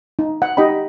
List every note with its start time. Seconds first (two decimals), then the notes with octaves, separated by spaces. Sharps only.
0.19 D#4
0.42 F#5
0.57 D#4 G4 D#5 G5 B5